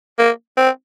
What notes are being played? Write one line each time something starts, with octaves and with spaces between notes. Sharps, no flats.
A#3
C4